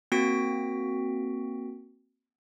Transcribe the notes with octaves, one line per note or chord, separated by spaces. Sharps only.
A#3 C4 F#4 A#6 B6 D7